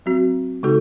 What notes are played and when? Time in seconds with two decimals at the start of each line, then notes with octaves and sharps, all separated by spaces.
0.06 F#3 C4 F#4
0.63 C#3 G#3 D#4 F#4 A4